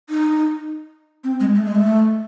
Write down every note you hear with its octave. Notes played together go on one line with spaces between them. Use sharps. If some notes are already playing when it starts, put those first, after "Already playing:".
D#4
C4
G#3
A3
G#3
A3